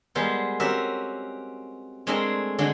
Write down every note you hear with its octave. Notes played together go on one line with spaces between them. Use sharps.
G3 G#3 B3 A4 A#4 C5
C4 C#4 F#4 G4 A#4 E5
G#3 A3 C4 D4 G#4 A#4
D3 G#3 D4 F#4